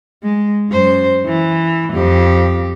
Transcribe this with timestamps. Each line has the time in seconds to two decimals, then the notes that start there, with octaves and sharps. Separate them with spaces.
0.23 G#3
0.69 F#2 C5
1.25 E3
1.93 F2 G4